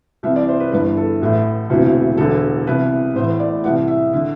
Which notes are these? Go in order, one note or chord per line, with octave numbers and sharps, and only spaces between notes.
C2 C3 E3 E5
D5
C5
B4
G1 G2 E3 B4
A4
A1 A2 E3
E1 D2 C3 E3
E1 E2 D3 A4
C2 C3 E3 B4
A1 A2 E3 C5
D5
C2 C3 E3 F#5
E5
D3 E5